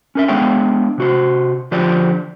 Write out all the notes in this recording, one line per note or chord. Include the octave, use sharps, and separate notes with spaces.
C#4 A#4 E5
G#3 B3 D4 C#5 F5 G5
C3 F#4 C5
D3 F3 F4 G4 C5 D5